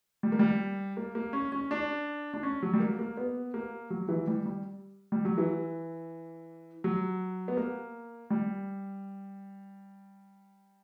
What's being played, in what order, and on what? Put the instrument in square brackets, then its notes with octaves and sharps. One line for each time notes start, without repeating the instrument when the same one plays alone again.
[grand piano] G3
A#3
G3
A#3
A#3
C#4
C#4
D4
D4
C#4
F#3
G3
A#3
A#3
B3
A#3
F#3
E3
G3
G3
G3
F#3
E3
F#3
B3
A#3
G3